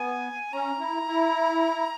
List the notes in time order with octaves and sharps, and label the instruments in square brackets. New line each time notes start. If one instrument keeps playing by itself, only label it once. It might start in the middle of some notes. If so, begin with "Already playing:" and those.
Already playing: [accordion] B3 [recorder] G#5
[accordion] C#4 [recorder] A#5
[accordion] E4
E4